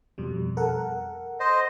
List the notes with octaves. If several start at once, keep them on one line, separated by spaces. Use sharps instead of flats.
F2 B2 G3
A4 A#4 F#5
C5 D#5